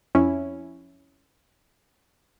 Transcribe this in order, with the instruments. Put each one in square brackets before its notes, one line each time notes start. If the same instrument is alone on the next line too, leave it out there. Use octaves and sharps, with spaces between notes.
[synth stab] F2 C#4 E4